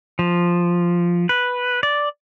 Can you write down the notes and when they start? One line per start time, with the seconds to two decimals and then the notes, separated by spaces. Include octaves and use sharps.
0.19 F3
1.29 B4
1.83 D5